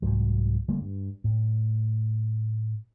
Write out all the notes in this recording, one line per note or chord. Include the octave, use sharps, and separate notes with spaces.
C2 F2 G#2 F#3
D3 G3 A3 A#3
G2
A2